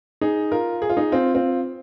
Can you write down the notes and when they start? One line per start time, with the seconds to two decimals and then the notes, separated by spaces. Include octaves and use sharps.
0.21 D#4 G#4
0.52 F4 A#4
0.82 G#4
0.90 F4
0.97 D#4 G#4
1.12 C4 F4
1.34 C4 F4